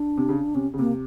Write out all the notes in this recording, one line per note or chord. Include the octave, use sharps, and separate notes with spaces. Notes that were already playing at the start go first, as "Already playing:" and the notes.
Already playing: D4
C3
C#3
C3 C#4
C#3
C3 A#3